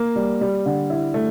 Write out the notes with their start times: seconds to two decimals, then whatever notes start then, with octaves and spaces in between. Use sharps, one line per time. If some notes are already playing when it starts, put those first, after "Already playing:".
Already playing: A#3
0.16 G3
0.41 G3
0.66 D3
0.90 E4
1.14 A3